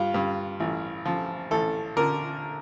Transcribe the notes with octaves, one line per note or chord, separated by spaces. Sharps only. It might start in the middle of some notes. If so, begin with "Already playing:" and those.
Already playing: G2 F4
G2
A1
F3
A1 A4
D3 A#4